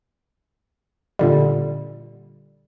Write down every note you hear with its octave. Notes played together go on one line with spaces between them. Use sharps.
A#2 D3 G3